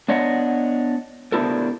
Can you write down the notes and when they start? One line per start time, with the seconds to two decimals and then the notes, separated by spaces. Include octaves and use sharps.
0.08 B3 D4 C#5 D#5 F#5
1.32 B3 D4 E4 G4 A4 A#4